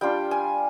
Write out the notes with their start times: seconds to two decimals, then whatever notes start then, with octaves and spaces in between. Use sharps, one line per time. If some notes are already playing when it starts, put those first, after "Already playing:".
0.01 G3 D4 F4 G5
0.31 G#5